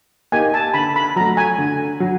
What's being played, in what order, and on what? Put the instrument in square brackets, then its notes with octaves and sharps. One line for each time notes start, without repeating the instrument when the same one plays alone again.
[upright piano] A#3 D#4 G4 [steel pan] G#5
[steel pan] A5
[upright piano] D3 [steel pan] B5
[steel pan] B5
[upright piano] F#3 [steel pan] A#5
[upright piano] A3
[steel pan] G#5
[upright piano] D3
F#3